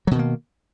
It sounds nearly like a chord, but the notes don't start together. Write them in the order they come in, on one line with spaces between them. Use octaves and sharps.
F#3 B2 D#3 A#3